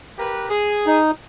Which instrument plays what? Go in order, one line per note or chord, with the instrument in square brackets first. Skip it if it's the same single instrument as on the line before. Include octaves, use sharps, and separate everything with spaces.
[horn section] G4 A#4 B4
G#4
[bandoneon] D#4